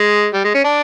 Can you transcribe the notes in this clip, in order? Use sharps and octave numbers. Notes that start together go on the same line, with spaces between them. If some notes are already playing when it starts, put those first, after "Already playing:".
Already playing: G#3
G3
G#3
C#4
D4